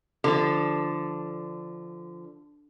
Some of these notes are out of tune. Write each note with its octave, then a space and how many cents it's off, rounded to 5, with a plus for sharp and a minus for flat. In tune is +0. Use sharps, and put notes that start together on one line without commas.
D3 +0 F3 -15 A4 +0